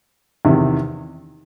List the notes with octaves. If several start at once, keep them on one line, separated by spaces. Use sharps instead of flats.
E2 C3 D#3